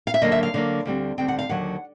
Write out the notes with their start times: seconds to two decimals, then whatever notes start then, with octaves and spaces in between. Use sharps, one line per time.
0.07 F5
0.14 E5
0.22 D3 F#3 A#3 D#5
0.32 E5
0.43 F5
0.54 D3 F#3 A#3
0.85 D2 D3 G3 C4
1.18 D2 D3 G3 C4 G5
1.28 F#5
1.39 F5
1.49 D#2 D3 F#3 F#5